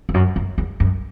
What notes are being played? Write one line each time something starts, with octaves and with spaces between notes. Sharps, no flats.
E2
F#2
F#2
E2
F#2